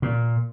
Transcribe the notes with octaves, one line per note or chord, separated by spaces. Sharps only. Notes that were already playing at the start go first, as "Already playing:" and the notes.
A#2